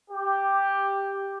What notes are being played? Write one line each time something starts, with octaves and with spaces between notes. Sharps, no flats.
G4